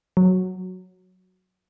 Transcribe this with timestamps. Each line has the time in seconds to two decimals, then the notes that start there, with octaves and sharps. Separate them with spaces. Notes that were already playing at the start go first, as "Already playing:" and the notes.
0.17 F#3